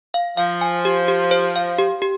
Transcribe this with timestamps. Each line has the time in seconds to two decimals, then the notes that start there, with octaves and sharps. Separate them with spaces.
0.14 F5
0.37 F3 F5
0.61 G#5
0.85 G4
1.08 G4
1.31 C5
1.56 F5
1.78 G4
2.02 G4